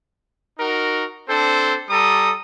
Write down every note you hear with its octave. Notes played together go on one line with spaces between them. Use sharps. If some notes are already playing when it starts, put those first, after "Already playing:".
D#4 F#4 A#4
C4 D4 A4 C5
G3 A4 A#5 D#6